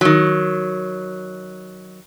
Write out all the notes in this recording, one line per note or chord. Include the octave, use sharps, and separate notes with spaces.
D#3 F#3